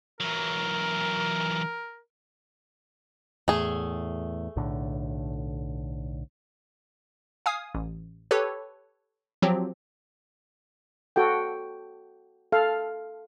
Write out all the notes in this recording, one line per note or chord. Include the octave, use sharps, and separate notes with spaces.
E3 F#3 A#4
E2 A2 A3 G#4
B1 A2 D3
F5 G#5 D#6
A1
G4 A4 B4 C#5
F3 F#3 C4 G4
F#4 A4 G5
A4 F5